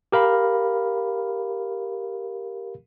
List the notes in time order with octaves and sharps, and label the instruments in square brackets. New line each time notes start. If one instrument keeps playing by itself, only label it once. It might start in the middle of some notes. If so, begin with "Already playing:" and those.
[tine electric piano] G4 A#4 F5 B5